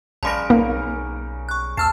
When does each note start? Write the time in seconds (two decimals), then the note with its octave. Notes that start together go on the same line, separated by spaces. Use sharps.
0.23 A#1 C#3 G3 A#4 A5 C6 A#6
0.50 B1 A#3 D#4
1.49 C#6 F#6
1.77 D#2 A5 E6 F6 C7